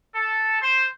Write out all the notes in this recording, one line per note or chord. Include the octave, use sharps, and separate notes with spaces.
A4
C5